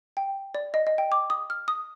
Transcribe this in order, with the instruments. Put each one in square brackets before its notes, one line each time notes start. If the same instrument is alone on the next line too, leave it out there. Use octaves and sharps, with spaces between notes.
[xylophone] G5
D5
D#5
D#5
G5
D6
D#6
F6
D#6